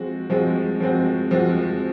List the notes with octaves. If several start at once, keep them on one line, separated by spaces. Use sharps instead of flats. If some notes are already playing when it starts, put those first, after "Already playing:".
Already playing: F3 G#3 C4 F#4
F3 G#3 C4 F#4
F3 G#3 C4 F#4
F3 G#3 C4 F#4